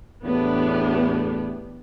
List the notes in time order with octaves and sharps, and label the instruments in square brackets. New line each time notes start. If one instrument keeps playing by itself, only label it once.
[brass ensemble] E2 A2 [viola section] B3 D4 G4